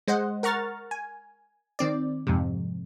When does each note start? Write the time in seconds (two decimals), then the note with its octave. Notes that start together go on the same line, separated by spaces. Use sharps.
0.08 G#3 C5 D#5 F#5
0.43 A#4 F#5 A#5 C#6 F6 A6
0.91 G#5
1.79 D#3 C4 D5
2.27 F2 G#2 C3